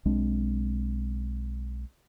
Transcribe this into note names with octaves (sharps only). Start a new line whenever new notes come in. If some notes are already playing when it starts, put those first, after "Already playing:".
B1 G#3 C4 D4